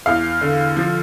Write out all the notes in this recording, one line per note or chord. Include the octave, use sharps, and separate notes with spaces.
E2 F5
D3
F3